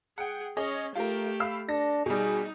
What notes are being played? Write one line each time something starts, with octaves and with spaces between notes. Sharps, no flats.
G#4 F#5 G5
C#4 G#4 C#5 D#5
A3 F4 G4 A#4
F5 B5 E6
D4 A4 A#6
B2 G3 D#4 G#4